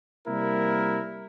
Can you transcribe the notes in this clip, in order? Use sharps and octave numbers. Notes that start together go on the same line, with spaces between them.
C3 G3 A#3 E4 A#4